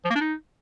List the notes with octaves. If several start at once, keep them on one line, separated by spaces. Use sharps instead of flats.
F3
A#3
D4
D#4